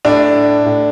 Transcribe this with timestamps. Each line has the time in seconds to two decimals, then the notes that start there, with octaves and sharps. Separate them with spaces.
0.05 A2 D4
0.66 A2